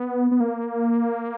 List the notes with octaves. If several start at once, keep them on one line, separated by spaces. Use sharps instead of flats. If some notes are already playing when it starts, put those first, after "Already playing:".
Already playing: B3
B3
A#3